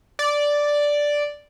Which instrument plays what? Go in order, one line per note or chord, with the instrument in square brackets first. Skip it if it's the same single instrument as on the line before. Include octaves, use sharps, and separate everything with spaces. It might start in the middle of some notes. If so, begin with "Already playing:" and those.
[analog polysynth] D5